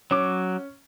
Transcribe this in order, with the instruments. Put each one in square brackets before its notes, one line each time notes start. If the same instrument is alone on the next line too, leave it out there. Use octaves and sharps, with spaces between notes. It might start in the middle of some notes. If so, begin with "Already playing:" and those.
[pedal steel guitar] F#3 D6 [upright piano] C#4